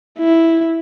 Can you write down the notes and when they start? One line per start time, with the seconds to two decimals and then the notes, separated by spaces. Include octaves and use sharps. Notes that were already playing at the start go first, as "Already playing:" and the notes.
0.19 E4